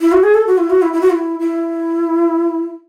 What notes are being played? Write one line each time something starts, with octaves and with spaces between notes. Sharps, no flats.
E4
F#4
G#4
A4
F#4
E4
F#4
E4
E4
F#4
E4
E4